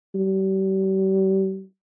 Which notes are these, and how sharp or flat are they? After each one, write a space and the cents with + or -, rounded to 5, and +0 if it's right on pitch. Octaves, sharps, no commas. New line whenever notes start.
G3 -40